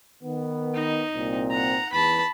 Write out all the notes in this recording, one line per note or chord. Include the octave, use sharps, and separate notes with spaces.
D#3 B3
D#4
C2 A#2 C4
F#5 A#5
E2 B4 A5 B5